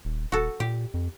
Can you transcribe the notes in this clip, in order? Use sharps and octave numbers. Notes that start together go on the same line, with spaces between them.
D#1
D#1 F#4 A4
A#2 G4
F2